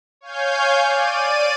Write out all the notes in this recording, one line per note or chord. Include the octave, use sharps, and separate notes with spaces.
C#5 F5 G#5 G6
D5 D#7